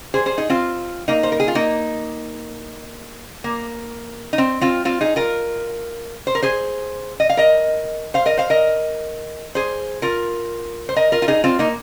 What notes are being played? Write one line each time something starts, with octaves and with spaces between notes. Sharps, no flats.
G#4 C5
G#4 C5
D#4 G#4
C4 F4
A#3 D#4
C5
A#4
G#4
F4
A#3 D#4
A#3
D#4
C4
C4 F4
C4 F4
D#4 G#4
F4 A#4
C5
A#4
G#4 C5
D#5
F5
A#4 D#5
C5 F5
A#4 D#5
C5 F5
A#4 D#5
G#4 C5
F4 A#4
C5
A#4 D#5
F4 A#4
F4
D#4 G#4
C4 F4
A#3 D#4